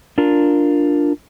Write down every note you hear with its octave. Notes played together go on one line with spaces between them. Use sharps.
D4 F4 A#4